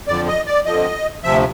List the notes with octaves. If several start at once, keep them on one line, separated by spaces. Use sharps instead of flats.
F2 D3 F3 D5
D#5
D5
F2 D3 F3 D#5
D2 C3 F3 E5